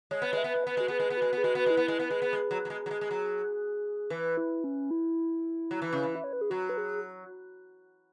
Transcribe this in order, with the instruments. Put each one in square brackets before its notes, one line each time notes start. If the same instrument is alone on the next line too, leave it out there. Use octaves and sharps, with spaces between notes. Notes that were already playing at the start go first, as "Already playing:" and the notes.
[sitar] G#3 [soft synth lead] C#5
[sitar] B3
[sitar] G#3 [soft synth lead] E5
[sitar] B3
G#3
[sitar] B3 [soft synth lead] B4
[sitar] G#3 [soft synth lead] F#4
[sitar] B3 [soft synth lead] G#4
[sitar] G#3
B3
[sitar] G#3 [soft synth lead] F#4
[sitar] B3
[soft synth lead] G#4
[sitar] G#3 [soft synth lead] F#4
[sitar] B3
[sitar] G#3 [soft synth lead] E4
[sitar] B3
G#3
B3
[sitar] G#3 [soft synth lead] G#4
[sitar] B3
G#3
F#3
F#3
G#3
F#3
G#3
G#3
F#3
[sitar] E3 [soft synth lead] B4
[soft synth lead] E4
C#4
E4
[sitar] F#3
E3
C#3
E3
[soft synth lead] E5
C#5
B4
G#4
[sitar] F#3 [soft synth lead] F#4
[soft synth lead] B4
G#4